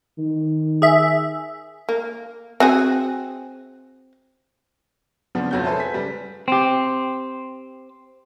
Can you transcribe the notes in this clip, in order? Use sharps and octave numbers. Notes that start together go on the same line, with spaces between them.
D#3
G#4 E5
A#3
C4 F#4 G#4
C#3 F3 B3 C4 D4
F1 B1 F2 F#4 C#5 G6
G#4 A4 B4 C5 E5 A5
G#5 B6
C#3 G3 B4
C4 G4